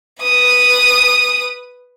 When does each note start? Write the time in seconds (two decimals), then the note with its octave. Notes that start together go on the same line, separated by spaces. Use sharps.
0.22 B4 D#6